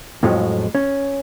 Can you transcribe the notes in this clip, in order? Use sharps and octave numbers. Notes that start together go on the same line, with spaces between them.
F2 A2 F3 F#3 G#3
C#4